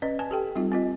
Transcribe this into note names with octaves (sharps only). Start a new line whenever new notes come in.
C#4 B4 D5 D#5
B4 G#5 A5
G4 A4 G5
G3 C4 D#4 F4
C4 F4 D#5